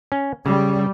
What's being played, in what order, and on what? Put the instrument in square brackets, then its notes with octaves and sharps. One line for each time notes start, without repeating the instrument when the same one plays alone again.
[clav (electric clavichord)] C#4
[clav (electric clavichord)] C#3 [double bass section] G3